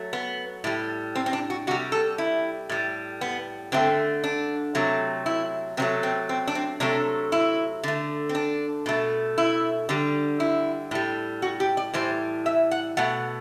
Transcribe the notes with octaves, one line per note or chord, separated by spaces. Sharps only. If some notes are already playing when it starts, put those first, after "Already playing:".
Already playing: F#3 A3
B3
A2 G3
C4
C4
D4
F#4
C3 G3 F#4
A4
E4
A2 G3
B3
D3 A3 C4
D4
C3 F#3 A3
E4
C3 F#3 A3 C4
C4
C4
D4
C4
C3 F#3 A3 D4
E4
D3 A3
C4
D4
B2 A3
E4
D3 G3
E4
A2 G3
F#4
G4
D5
A2 E3 G3 C5
E5
F#5
B2 A3 F#5